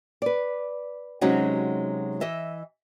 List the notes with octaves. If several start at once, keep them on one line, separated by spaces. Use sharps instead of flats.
B4 D5
C3 F#3 G#3 C#4 D#4 F#4
E3 D#5 E5